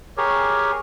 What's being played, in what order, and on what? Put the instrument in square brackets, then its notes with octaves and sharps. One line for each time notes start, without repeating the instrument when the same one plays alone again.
[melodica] G4 G#4 A#4 C#5